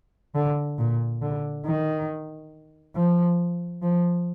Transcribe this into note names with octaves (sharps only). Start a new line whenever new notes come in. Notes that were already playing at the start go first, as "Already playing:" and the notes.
D3
A#2
D3
D#3
F3
F3